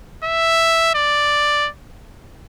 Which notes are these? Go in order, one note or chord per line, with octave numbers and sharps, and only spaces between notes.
E5
D5